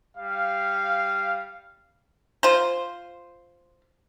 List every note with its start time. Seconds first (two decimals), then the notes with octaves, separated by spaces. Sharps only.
0.17 G3 F5
2.43 F4 C5